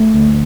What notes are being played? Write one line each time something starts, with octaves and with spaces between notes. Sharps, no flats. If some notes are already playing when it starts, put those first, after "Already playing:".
Already playing: A3
D2